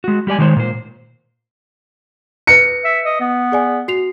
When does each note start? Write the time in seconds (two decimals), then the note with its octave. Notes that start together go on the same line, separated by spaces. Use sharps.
0.04 G#3 F#4
0.27 G3 G4 D5 G#5
0.39 D#3 F#3 G#3 A4 C5 C#5
0.56 A#2 C5
2.47 B4 F#6 A#6 C#7
2.84 E5
3.05 D#5
3.21 B3
3.52 G#4 D5 G#5
3.88 F#4 C7 F7